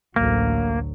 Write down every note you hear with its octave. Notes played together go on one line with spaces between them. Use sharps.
A1 D2 F#3 A#3